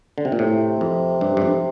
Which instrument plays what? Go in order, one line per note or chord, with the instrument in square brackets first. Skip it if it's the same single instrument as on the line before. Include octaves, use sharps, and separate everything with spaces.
[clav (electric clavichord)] D3
C3
A#2
[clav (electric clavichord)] A2 [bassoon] C3
[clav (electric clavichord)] F2
G2
G2
F2